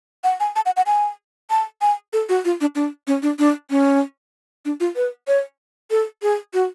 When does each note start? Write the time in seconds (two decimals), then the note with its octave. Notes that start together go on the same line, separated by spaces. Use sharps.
0.24 F#5
0.40 G#5
0.56 A5
0.66 F#5
0.77 F#5
0.86 G#5
1.50 A5
1.82 G#5
2.13 A4
2.29 F#4
2.45 F4
2.61 D4
2.75 D4
3.07 C#4
3.22 D4
3.39 D4
3.70 C#4
4.65 D4
4.80 F4
4.96 B4
5.28 C#5
5.91 A4
6.22 G#4
6.54 F#4